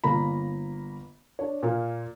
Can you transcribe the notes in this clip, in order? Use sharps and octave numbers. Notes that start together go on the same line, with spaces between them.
G1 A#3 A#5 B5
D4 C#5
A#2 A#3